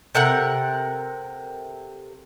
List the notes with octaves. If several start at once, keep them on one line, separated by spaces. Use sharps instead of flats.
C3 A4 A#4 F#5